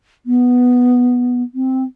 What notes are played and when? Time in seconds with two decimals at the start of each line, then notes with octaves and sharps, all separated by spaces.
0.26 B3
1.54 C4